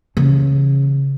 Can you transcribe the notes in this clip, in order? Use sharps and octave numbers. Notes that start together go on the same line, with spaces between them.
C#3 E3